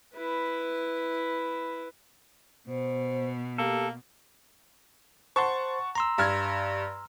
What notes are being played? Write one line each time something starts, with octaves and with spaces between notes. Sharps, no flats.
E4 B4
B2 C5
A#3 G4 A4
C5 F#5 A5 C6 C#6
A#5 C6 E6
G2 F6 G#6